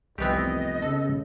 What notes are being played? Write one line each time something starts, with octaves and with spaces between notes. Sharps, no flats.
F1 C2 E3 B3 C4 G4 D#5
C#3 A4